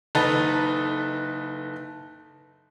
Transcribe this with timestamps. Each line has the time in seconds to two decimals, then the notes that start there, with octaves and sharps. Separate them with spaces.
0.15 F#1 D#4 A4 B4 A6